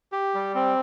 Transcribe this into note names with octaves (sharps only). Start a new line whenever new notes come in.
G4
G3
C4